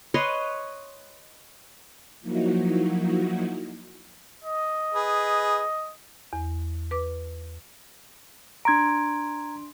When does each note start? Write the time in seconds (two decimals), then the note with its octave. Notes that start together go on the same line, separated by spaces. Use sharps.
0.14 B4 C#5 D#5 C6
2.21 F3 F#3 A#3 D#4 E4 F#4
4.44 D#5
4.94 G#4 B4
6.33 E2
6.91 B4 D6
8.65 D4 A#5 C6 G#6 D7